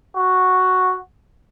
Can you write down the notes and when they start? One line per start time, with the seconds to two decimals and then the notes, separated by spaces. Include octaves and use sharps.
0.16 F#4